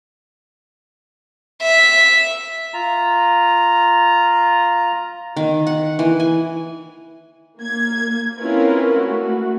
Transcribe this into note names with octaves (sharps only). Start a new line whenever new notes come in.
E5
F4 A#5
D#3
F#5
E3
G#5
A#3 G#6
C4 C#4 E4 F4 A#4 B4
A3 F#4